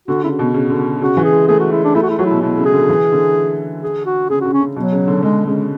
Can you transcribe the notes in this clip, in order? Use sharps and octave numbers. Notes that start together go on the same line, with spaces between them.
D3 F#4
C#3 E4
F#4
B2
C#3
D3
C#3 F#4
E3
G#4
G#3
A3 G#4
F#4
G#3 E4
D4
A3 E4
F#4
G#3 E4
F#3 F#4
E4
B2
B2 E4
C#3
G#4
D3
E3
D3
G#4
F#4
C#3 G#4
C#3 F#4
C#4
C#3
B2 F#3
C#3
D3
D3 G#3
C#3 G#3